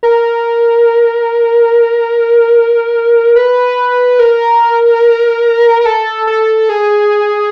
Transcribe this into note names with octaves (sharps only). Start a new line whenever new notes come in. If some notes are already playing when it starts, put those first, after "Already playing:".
A#4
B4
A#4
A#4
A4
A4
G#4